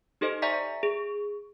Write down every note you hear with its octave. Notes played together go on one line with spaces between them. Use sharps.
D#4 G4 A4 C5 D#5
D5 E5 G#5 A#5 C#6 B6
G#4